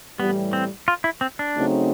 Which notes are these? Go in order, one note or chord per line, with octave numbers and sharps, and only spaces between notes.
A2 E3 G3 B3
C4
F4
E4
C4
D4
C#3 F#3 A3 C4 D#4